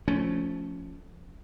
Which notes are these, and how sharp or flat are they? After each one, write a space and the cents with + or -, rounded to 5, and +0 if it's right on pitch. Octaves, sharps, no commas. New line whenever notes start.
F3 +0 A3 +0 C#4 +15